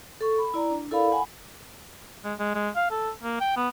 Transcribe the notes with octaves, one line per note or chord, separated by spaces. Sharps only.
A4 C#6
B5
E4 D5 A#5
D4
E4 A4 A#4 D5 F5 B5
F#5 G#5 B5
G#3
G#3
G#3
F5
A4
A#3
G5
B3